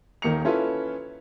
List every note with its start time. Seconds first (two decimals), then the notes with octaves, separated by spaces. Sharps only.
0.22 D#1 D#3 A#3 C#7 F7
0.45 C#4 E4 F4 A4 B4